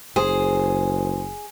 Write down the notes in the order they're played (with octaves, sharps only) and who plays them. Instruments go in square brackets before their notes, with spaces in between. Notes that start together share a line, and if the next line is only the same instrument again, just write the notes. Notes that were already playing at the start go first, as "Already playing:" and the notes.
[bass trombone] F#1 [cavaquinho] G#4 [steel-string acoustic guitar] C5